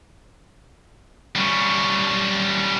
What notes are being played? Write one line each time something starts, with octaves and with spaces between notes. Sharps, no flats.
G3 C#4